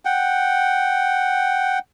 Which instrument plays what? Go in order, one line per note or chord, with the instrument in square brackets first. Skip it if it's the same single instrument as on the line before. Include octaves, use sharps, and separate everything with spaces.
[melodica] F#5 G5